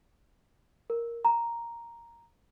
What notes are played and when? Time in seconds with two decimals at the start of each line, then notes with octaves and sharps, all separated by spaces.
0.90 A#4
1.25 A#5